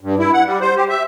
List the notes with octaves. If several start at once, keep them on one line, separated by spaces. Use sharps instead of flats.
G2
E4
F#5
G3
C5
G4
E5